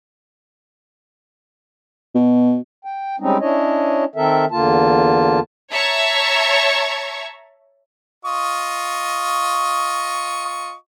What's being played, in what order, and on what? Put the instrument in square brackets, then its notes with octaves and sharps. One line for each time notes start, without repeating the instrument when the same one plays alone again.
[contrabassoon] B2
[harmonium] G5
G3 G#3 C4 C#4 D#4
C#4 D4 E4 C#5 D#5
D#3 C4 A4 A#4 E5
E2 D3 A#3 F4 A5
[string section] C#5 E5 A5 A#5 C#6 G#6
[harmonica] F4 D#5 C#6